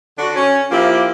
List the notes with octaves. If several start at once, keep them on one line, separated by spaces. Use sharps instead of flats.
D3 D4 F#4
C#4
F3 A#3 E4 F4 G4